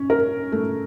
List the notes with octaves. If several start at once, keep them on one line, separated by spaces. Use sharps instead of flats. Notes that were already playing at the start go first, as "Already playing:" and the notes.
Already playing: C#4
A#4
A3